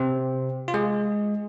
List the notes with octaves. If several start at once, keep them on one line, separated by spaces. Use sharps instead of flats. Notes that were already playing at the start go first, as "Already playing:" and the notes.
Already playing: C3 C4
F4
G#3 G#4